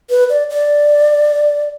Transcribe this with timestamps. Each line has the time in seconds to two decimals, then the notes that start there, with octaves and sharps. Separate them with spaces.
0.10 B4
0.30 D5
0.50 D5